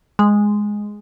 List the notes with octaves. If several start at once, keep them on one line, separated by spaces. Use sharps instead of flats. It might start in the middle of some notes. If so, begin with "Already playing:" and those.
G#3